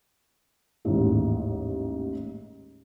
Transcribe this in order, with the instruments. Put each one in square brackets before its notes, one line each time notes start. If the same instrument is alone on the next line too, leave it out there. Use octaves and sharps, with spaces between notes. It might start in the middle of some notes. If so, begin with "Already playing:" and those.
[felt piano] A1 D#2 G#2 D#3 E3